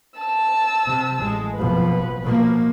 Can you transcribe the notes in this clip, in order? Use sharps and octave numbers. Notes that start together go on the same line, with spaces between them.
A5 E6
C3
A1 G#3
F#1 B2 F3 B4
B2 F3 A#3